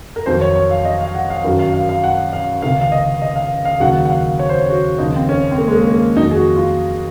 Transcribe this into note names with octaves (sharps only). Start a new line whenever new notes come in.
A#4
F2 D#3 F#3 C5
C#5
C#5
F5
D#5
F5
F#5
F5
F#2 D#3 F#3
F5
F5
F5
F#5
F5
C#2 C3 D#3 F5
F5
D#5
D#5
F5
F5
D#2 C#3 F#3 F#5
F#5
F5
C#5
C5
C#5
F#4
D#2 C#3 F3 D#4
C4
C#4
C4
A#3
G#3
A#3
A#3
F2 D#3 F#3 D#4
G#4
F#4
F4